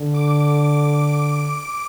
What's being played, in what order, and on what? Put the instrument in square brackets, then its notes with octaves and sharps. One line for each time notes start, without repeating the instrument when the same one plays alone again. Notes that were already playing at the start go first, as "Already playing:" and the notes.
Already playing: [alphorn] D3
[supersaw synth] D6